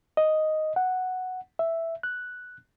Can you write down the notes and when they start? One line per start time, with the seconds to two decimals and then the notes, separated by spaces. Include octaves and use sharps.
0.17 D#5
0.76 F#5
1.59 E5
2.03 F#6